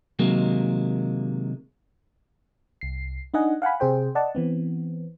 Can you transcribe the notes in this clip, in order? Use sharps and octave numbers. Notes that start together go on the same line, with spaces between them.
C3 D#3 F#3 G#3 A#3
C2 C7
D4 D#4 D#5 F#5 G#5
F5 F#5 G#5 B5
C3 G#4 C5 G5
D5 D#5 F#5 A5
E3 B3 C4